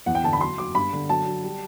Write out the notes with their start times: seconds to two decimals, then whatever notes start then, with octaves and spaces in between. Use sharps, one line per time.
0.06 E2 F#5
0.15 G5
0.23 D3 A5
0.33 B5
0.40 F#3 C6
0.58 F#3 D6
0.75 G2 B5
0.93 D3
1.09 F#3 A5
1.26 F#3
1.43 G3